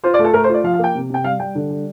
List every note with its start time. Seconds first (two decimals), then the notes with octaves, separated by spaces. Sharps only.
0.04 F4 C5
0.14 D5
0.19 A3
0.24 A4
0.33 A3 A#4
0.44 C5
0.49 F4 D5
0.64 F3 F5
0.74 F5
0.79 A#3 G5
0.95 C3
1.10 C3 G5
1.24 G3 F5
1.40 G3 G5
1.55 D3
1.70 G3